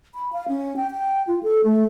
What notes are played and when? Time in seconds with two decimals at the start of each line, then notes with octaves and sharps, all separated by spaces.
0.14 B5
0.33 F5
0.48 C#4
0.77 G5
0.91 G5
1.27 F4
1.43 A4
1.64 A3